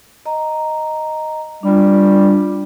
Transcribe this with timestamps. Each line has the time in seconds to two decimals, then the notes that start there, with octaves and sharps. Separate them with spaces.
0.26 D#5 A#5
1.63 G3 D4 F4